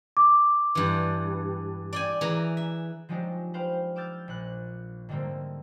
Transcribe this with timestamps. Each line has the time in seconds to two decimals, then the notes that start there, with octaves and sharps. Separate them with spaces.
0.17 D6
0.75 G2 E3
1.93 D5 G5 G#5
2.21 E3 G#4 A#5
2.57 E5
3.09 F3 F#3 G#3 D4 D#4 G4
3.54 B4 C5 F5 G5
3.96 D6 E6 F6 G6 A6
4.28 A#1 F#6
5.09 G#2 D3 G3 A3 A#3 C4